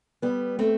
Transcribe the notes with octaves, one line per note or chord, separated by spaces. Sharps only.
G3 B3
A3 C4